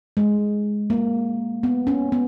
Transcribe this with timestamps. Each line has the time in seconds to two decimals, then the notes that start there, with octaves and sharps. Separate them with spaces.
0.17 G#3
0.90 A#3
1.63 B3
1.87 C#4
2.12 B3